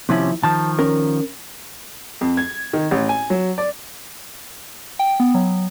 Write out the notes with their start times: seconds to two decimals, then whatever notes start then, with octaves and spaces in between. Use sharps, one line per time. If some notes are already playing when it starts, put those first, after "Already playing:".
0.09 D#2 C3 F3 C#4 E4
0.43 D#3 F3 A5
0.79 C#4 A#4
2.21 F2
2.37 G#6
2.73 D#3
2.91 A1
3.09 G#5
3.30 F#3
3.58 D5
4.99 G5
5.20 B3
5.34 F#3